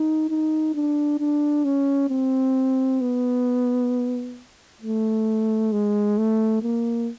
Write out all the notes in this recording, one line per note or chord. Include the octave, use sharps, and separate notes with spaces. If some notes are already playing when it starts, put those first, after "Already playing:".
Already playing: D#4
D#4
D4
D4
C#4
C4
B3
A3
G#3
A3
A#3